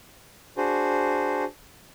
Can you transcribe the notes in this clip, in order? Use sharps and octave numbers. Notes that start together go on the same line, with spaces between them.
D4 F#4 G#4 C5